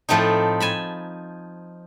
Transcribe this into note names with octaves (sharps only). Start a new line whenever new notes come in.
A2 F3 A3 C4 D#4
G#5 A5 B5